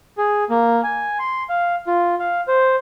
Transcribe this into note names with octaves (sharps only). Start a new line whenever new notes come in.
G#4
A#3
G#5
C6
F5
F4
F5
C5